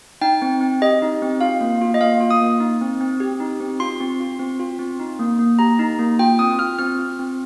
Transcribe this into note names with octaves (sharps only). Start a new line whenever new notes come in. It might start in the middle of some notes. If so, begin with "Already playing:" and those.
D#4 G5
C4
C4
G4 D#5
D#4
C4
F4 F5
A#3
F4
D#5
A#3 F5
F4
D#6
A#3
D#4
C4
C4
G4
D#4
C4
F4 C6
C4
F4
C4
F4
C4
D#4
A#3
A#3
G4 A#5
D#4
A#3
F4 G5
C4 D#6
F4 F6
C4 F6
F4
C4